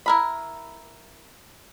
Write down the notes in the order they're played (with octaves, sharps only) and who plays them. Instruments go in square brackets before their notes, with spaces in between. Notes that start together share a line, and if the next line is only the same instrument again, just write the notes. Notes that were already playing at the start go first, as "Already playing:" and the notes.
[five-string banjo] E4 A#4 B5